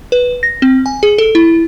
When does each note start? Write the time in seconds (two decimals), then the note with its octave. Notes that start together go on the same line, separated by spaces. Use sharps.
0.12 B4
0.43 A#6
0.62 C4
0.86 G#5
1.03 G#4
1.18 A4
1.35 E4